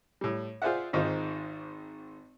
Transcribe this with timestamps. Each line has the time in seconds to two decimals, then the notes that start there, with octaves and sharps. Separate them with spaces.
0.21 A2 G3
0.62 F4 G#4 C5 D5 E5 F#5
0.93 G#1 G#2 D#3 F4 C5